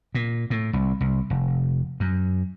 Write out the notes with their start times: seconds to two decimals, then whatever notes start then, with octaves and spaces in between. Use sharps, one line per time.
0.15 A#2
0.50 A2
0.73 C2
1.01 C2
1.30 F1
2.00 F#2